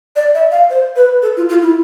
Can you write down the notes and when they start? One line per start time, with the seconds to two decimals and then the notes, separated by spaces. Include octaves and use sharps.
0.16 D5
0.34 E5
0.51 F5
0.70 C5
0.96 B4
1.22 A4
1.37 F4
1.49 F4
1.62 E4